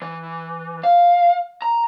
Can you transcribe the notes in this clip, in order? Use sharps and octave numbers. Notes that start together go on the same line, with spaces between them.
E3
F5
A#5